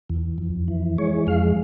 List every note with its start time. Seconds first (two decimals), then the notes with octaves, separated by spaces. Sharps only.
0.10 E2
0.38 F2
0.68 E3
0.98 G#3 C#5
1.27 F2 F5